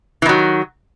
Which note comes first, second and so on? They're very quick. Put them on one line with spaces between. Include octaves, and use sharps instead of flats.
E3 D#3 F#3